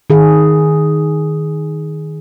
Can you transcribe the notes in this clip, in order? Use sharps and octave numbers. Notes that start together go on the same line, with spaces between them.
D#3 G#4